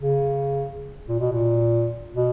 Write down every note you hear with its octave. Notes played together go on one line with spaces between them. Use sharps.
C#3
A#2
B2
A#2
B2